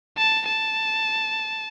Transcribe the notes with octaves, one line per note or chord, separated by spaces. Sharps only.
A5
A5